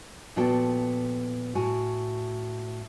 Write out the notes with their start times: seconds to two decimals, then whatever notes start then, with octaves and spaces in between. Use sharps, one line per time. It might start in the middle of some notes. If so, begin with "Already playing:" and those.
0.36 A#2 F3 B3 F#4 A4 G5
1.55 A2 F#4 G#5